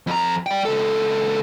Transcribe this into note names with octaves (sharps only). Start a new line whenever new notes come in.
F2 A#5
D5 G5
C#2 A4